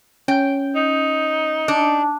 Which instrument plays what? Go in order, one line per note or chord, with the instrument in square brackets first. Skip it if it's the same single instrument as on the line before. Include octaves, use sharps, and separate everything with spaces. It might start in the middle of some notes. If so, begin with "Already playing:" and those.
[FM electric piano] C#4 G6 [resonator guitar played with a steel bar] G5
[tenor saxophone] D#4
[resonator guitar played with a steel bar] D4